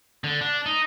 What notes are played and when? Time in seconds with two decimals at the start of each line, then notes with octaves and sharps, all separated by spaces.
0.24 D3
0.41 D4
0.66 D#4